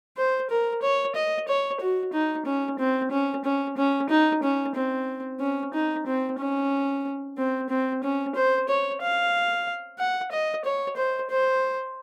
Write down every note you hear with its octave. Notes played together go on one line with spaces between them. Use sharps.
C5
A#4
C#5
D#5
C#5
F#4
D#4
C#4
C4
C#4
C#4
C#4
D#4
C#4
C4
C#4
D#4
C4
C#4
C4
C4
C#4
C5
C#5
F5
F#5
D#5
C#5
C5
C5